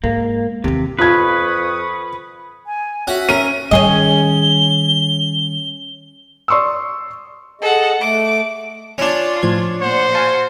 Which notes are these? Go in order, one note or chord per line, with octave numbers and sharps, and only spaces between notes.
G#2 A#3
D#2 C3 E3
F2 F4 B4 C#6 D#6 G#6
G#5
C#4 F#4 E5 F#5
C#4 A#4 D#7
D#3 G3 C#4 G#4 D#5 G7
D5 C6 C#6 D#6 E6
G#4 A4 D#5 F#5
A3 D6
C#4 D4 F4
A2 F3 G#6
A#2 C5 F#5
F#4 F5 G#5 A5